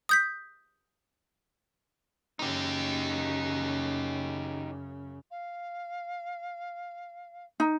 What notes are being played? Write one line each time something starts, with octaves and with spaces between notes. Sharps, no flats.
D#6 G6 B6
F#2 C#3 D#4 G4
F5
D#4